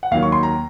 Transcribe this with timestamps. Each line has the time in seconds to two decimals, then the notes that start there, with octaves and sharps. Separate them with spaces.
0.03 F#5
0.11 D#2 D#3 F#3 F5
0.23 C#6
0.32 C6
0.43 A#5